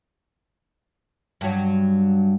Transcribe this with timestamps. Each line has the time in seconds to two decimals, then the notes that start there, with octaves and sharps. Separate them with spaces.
1.41 G2 F#3